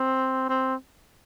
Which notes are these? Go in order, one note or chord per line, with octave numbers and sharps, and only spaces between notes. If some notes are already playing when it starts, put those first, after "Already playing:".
Already playing: C4
C4